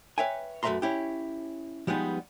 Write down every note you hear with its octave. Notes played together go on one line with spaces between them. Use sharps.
B4 C#5 E5 G5 G#5
F#2 A3 B4 E5 A#5 C6
C#4 E4 G4
F3 G3 G#3 B3 D#4